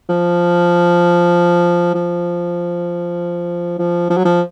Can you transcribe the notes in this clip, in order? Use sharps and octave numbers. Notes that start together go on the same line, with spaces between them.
F3
F3
F3
F3
F#3
F3